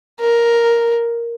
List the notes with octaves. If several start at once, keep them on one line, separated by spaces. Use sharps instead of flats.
A#4